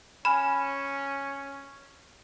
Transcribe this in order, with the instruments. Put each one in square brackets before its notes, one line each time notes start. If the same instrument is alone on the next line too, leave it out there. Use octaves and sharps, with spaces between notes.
[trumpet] C#4 [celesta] G#5 F6 G#6 [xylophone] B5